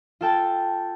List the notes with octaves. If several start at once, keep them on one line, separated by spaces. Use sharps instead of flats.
F4 A4 G5 A5